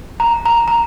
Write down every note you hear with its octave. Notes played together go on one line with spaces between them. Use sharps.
A#5
A#5
A#5